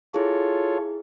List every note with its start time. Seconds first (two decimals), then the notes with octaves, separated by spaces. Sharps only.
0.14 E4 F4 G#4 A4 C#5